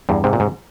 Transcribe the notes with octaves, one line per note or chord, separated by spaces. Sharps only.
E2 G2
G#2 C3
A#2
G#2